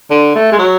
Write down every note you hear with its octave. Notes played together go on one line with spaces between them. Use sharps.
D3
A3
G#3
F#3